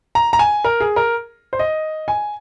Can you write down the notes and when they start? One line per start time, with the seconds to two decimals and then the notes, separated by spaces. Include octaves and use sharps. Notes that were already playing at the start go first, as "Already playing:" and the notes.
0.15 A#5
0.33 A#5
0.39 G#5
0.64 A#4
0.80 G#4
0.96 A#4
1.53 C5
1.59 D#5
2.08 G#5